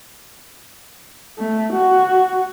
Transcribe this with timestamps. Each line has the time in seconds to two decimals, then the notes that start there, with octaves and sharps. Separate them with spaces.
1.39 A3
1.73 F#4